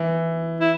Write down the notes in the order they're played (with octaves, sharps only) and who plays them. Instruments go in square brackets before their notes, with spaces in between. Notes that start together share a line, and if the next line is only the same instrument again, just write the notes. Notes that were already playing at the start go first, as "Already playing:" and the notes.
Already playing: [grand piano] E3
[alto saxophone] E4